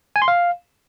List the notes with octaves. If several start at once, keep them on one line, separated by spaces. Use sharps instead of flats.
G#5
C6
F5